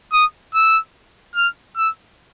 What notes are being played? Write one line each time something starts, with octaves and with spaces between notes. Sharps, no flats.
D#6
E6
F6
E6